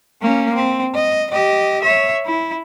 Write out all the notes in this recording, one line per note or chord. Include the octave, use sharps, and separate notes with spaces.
A#3 C#4
C4
D#5
G4 D#5
C#5 E5
E4